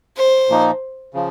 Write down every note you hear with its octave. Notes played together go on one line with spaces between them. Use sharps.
C5
A#2 F3 A#3 D#4
C#3 F3